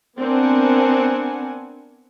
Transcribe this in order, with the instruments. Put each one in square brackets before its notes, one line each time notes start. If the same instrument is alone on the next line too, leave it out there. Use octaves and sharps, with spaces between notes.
[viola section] B3 C4 D4 A#4 F#5 G#5